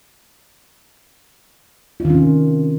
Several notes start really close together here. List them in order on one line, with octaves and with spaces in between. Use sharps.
F4 D#3 C#4 C3